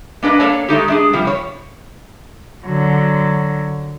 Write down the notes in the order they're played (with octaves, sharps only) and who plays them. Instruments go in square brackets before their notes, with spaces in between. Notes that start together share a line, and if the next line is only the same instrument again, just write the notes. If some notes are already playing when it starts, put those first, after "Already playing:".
[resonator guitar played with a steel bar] A#3 D4 B4 D#5
A#3 D4 A4 C#5 D5
G#3 A3 D#4 G4
G#3 D4 G#4
C3 F3 G3
C#5
[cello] D3 F#3